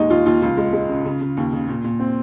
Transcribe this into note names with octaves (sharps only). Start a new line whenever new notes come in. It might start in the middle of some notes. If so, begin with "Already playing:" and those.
Already playing: D#2 G#3 D#4
D#2 F4
D#2 F4
C#2 F4
G#3
G#3
C#3
C#3
C#3
D#2
C#3
A#2
A#2
C4